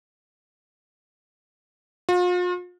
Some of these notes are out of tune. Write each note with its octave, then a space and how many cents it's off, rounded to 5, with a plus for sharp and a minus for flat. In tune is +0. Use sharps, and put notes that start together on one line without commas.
F4 +40